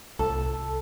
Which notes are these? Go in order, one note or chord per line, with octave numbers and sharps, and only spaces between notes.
C2 A4